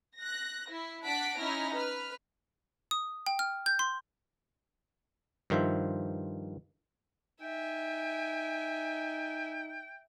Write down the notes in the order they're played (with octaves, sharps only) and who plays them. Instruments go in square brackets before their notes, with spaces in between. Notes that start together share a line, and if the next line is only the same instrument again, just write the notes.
[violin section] F#6 A#6
E4
D4 F#5 A5 F#6 B6 D7
C#4 D#4 E4 F6 A#6
B4 F6
[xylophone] D#6
G5
F6
G6
C6
[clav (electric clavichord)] G2 D#3 F3 C5 E5
[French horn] D#4 [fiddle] E5 G#5 [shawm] G5